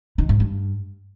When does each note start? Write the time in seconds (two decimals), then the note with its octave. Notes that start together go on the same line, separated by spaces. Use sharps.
0.18 D#3
0.29 G#2
0.40 G2